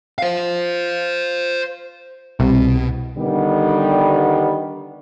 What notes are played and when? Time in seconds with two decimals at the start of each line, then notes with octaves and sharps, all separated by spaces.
0.18 C5 F5
2.40 C2 B2
3.17 D3 D#3 G3 B3